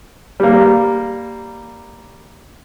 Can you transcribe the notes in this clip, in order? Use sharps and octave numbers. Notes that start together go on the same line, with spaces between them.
G3 A#3